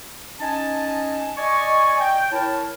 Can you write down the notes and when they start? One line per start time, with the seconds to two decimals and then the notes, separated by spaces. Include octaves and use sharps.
0.40 C#4 D#4 D#5 G#5 A5
1.37 D5 D#5 G#5 C#6
2.01 G5
2.32 E4 A#4 C#5 A5